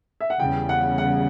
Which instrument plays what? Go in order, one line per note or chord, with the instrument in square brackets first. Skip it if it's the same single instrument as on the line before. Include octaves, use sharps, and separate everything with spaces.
[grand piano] E5
F#5
[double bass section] E2 C#3 G3 [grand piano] G5
[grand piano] F#5
F#5